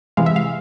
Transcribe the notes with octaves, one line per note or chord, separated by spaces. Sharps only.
C3 E3 G#3 F5
E5
F5